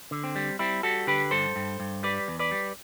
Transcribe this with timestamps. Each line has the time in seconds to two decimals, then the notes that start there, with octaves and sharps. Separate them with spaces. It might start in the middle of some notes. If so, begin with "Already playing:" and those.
0.11 D3
0.24 C4
0.36 G3
0.59 G3 C4 E4
0.83 G3 F#4 A4
1.07 D3 G4 B4
1.31 G2 A4 C5
1.56 G2
1.80 G2
2.03 G3 B4 D5
2.28 E2
2.39 B4 D5
2.51 G3